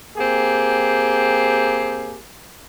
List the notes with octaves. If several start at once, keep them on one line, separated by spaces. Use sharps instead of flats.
A#3 C4 G4 G#4